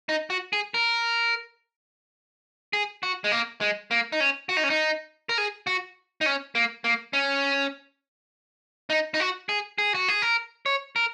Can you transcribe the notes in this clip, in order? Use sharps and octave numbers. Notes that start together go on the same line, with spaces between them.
D#4
F#4
G#4
A#4
G#4
F#4
G#3
A#3
G#3
A#3
D#4
C#4
F#4
D#4
C#4
D#4
A#4
G#4
F#4
D#4
C#4
A#3
A#3
C#4
D#4
D#4
F#4
G#4
G#4
F#4
G#4
A#4
C#5
A#4